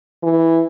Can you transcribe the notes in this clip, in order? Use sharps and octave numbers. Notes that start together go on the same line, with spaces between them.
E3